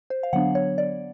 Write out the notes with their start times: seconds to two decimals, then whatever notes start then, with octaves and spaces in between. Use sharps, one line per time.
0.10 C5
0.23 F5
0.33 D3 F#3 B3 D4 F#5
0.55 C#5
0.78 D5